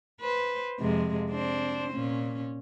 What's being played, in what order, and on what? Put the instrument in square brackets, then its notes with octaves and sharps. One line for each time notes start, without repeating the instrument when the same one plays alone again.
[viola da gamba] B4 C5
F2 C3 G#3
C4 D4 C5
A#2 C#4